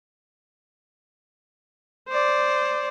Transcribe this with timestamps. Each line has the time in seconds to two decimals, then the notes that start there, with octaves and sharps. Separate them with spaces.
2.09 C5 D5